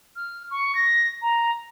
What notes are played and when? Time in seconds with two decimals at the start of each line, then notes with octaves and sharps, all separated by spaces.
0.16 F6
0.51 C#6
0.75 A#6
1.22 A#5